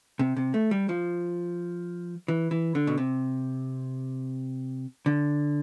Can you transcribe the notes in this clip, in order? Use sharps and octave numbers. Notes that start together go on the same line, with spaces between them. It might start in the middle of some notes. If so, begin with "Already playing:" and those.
C3
C3
A3
G3
F3
E3
E3
D3
B2
C3
D3